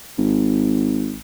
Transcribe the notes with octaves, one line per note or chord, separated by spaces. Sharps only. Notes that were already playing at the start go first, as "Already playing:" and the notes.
G#1